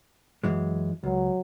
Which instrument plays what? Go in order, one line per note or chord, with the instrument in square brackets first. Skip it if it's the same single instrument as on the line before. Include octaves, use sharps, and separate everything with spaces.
[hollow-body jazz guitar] F#2 E3 G#3
[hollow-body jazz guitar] C#2 [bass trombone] F#3